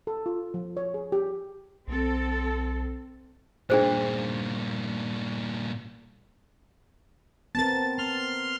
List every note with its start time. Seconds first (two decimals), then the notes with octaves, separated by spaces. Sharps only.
0.07 A4
0.26 F4
0.54 F3
0.77 C#5
0.94 G#4
1.12 G4
1.88 B1 C4 A4
3.70 G2 A#2 D4 G#4 C5
7.55 B3 C4 A#4 A5 A6
7.98 B3 C6 F6